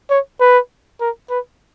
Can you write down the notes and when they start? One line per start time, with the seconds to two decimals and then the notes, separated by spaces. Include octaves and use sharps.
0.10 C#5
0.40 B4
1.01 A#4
1.30 B4